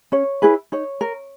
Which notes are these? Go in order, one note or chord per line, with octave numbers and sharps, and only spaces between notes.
C#4 C#5
E4 G#4 B4
D#4 C#5
A#4